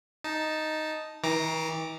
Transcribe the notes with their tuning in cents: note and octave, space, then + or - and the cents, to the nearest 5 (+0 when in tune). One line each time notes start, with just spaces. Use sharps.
D#4 +0 A5 +0
E3 -45 A#5 +0 D6 +5